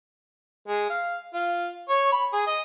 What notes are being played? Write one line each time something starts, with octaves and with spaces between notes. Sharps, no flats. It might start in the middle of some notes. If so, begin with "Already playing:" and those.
G#3
F5
F4
C#5
B5
G#4
D#5